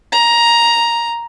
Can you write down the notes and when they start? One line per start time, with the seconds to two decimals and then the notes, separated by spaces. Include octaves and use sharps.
0.12 A#5